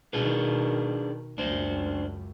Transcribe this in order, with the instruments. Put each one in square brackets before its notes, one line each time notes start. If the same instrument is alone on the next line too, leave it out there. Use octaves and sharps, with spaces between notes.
[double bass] B2 D#3 [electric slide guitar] D4 G#4 B4
[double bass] C#2 F#2 [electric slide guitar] D4 C5